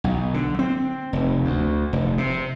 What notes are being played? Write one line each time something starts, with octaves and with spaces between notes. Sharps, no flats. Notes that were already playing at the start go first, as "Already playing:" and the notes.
B1
D3
C4
F1
D2
F1
C3